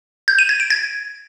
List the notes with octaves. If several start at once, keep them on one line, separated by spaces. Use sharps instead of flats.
G6
D#7
G#6
D7
G#6